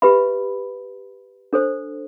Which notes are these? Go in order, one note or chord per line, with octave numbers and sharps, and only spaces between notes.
G4 B4 E5 B5
D4 A4 C5